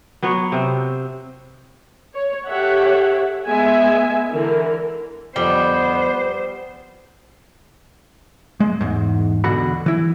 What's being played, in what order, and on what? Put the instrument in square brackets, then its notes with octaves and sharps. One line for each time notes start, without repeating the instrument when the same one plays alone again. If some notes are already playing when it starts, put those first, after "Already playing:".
[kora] F#3 B3 B4 C#5
C3 C4 C5
[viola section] C#5
G4 A4 C#5 E5 F#5
G#3 B3 E5 G#5
D3 E3 A#4
[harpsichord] F2 D3 [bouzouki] G3 [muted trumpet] B3 [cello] C5
[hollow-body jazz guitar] G#3
E2 G#2
E2 B2 D3 F#4 F#5 B5
E3 E4